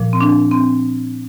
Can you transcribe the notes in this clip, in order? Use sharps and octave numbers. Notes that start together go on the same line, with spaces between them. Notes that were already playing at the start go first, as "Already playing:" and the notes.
Already playing: A#2 F3
C4
D4
C4